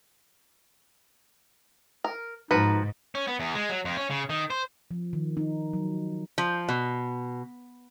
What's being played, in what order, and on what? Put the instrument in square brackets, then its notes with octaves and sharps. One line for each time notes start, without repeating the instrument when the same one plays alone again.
[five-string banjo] A#4
[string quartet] G#2 [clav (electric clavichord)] F3 F#4 [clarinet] D#4 [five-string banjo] B4
[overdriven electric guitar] C#4
B3
E2
G#3
F#3
F2
C#4
C#3
D#3
C5
[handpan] F3
D#3
D#4
F#3
[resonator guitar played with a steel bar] F3
B2